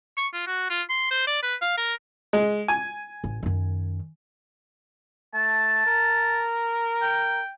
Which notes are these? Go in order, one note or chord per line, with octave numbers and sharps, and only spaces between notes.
C#6
F4
F#4
F4
C6
C5
D5
B4
F5
A#4
G#3
G#5
A1
F#2 D#3
A3 A5
A#4
G5